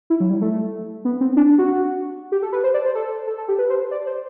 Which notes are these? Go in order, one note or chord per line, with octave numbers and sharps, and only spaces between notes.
E4
F#3
G3
A3
B3
C4
D4
F#4
G4
A4
B4
C5
D5
C5
A4
A4
A4
G4
B4
C5
D5
C5